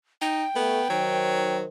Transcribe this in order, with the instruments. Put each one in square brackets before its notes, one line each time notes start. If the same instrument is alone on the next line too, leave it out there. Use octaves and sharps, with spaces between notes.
[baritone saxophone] D#4 [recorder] G5
[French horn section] A3 [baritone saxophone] B3
[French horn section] D#3 C5 [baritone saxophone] F#3